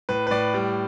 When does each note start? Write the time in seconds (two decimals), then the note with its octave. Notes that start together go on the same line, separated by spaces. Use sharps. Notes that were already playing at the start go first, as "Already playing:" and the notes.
0.09 A2 B4
0.27 B4
0.31 A2 D5
0.54 G3